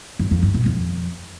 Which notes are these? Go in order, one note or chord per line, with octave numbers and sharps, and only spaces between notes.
F#2
F2
G2
B2
F2